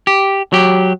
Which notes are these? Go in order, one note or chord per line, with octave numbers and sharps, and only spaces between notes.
G4
F#3 G4